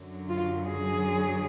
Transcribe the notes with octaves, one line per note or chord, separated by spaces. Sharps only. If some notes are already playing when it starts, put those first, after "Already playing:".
Already playing: F#2 D3 F#3
F4
G#4